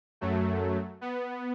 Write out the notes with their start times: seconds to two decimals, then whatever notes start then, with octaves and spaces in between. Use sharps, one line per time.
0.21 F#2 F#3 A3
1.01 B3